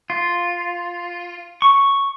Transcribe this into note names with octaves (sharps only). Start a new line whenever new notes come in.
F4
C#6